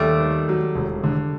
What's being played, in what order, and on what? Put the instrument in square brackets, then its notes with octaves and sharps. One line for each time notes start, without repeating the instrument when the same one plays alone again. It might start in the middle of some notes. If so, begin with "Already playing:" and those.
Already playing: [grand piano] D#2 [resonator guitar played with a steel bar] G3 A3
[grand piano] D#3
F#3
E1
D3